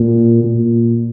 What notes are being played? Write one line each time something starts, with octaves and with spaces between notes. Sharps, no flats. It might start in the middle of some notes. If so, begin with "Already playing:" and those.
Already playing: A#2
A#2